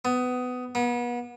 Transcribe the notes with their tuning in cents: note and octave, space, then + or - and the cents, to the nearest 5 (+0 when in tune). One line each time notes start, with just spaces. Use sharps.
B3 +20
B3 -35